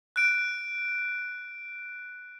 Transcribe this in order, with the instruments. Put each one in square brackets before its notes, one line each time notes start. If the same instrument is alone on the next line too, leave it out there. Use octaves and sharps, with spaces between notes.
[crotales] F#6 D7